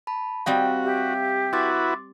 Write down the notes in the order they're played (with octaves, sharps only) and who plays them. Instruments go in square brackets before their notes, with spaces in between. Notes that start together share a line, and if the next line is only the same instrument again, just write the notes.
[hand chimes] A5 B5
[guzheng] G3 C4 D#5 [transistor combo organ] F#4 [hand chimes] F5
[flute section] G4 E5
[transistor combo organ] E4 F#4 B4 [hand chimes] C6 D6 A6